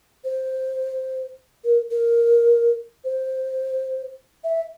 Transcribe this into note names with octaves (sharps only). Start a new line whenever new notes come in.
C5
A#4
A#4
C5
E5